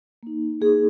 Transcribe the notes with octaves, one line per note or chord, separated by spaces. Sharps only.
A#3 D#4
A#3 D#4 G#4